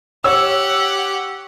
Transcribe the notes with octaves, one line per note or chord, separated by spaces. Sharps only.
G4 C#5 F#5 E6